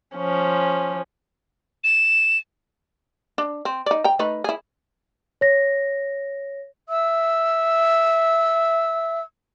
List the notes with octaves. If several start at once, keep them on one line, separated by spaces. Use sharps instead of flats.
F3 C#4
E7
D4
C4
D#4 D5
G5 A#5
A3 D#4 B4
E4 G#4
C#5 A#6
E5 E6